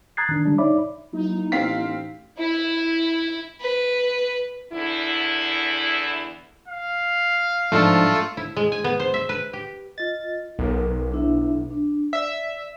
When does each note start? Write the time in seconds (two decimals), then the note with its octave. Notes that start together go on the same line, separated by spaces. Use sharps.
0.17 A#5 D#6 F#6 G#6 A6 C7
0.29 D#3 D4
0.45 D3 G3 D4
0.58 D#4 C#5 D5 E5 B5 D6
1.13 F#3 A#3 D#4 E4
1.52 A1 C4 F5 B6
2.40 E4
3.61 B4
4.73 E2 D3 E4
6.68 F5
7.72 G#2 F3 A3 D4 F4 A4
8.37 E4
8.56 G#3
8.72 G#5
8.84 B3
9.00 C5
9.14 E5
9.29 B4
9.53 G4
9.98 F4 D#5 A6
10.59 B1 A#4
11.12 D4 E4 E5
11.71 D4
12.13 D5 E5